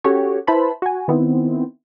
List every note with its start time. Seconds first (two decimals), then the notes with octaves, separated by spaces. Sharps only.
0.04 C#4 F#4 G4 A4 C#5
0.47 E4 B4 C5 A5 B5 C6
0.82 F#4 G#5
1.08 D#3 B3 C4 E4